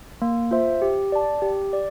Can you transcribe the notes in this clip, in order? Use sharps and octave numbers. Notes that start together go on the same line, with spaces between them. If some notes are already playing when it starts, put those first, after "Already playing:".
A#3
F4 C5 E5
G4
D5 A5
G4
D5